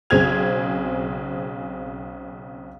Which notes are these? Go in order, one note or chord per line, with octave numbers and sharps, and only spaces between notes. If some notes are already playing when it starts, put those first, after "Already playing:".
B1 C#3 C4 G#4 G#6 F7